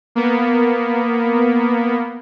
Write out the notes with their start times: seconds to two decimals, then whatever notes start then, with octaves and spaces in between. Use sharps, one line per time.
0.15 A#3 B3